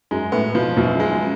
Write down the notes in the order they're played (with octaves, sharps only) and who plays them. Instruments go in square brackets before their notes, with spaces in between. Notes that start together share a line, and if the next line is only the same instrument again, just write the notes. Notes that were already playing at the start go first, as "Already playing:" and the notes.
[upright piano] F#2 [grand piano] G#3
[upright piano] A2 [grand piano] B3
[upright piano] B2 [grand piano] F3
[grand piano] F#2 [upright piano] B2
[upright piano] C#3
[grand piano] G#3
[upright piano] C#3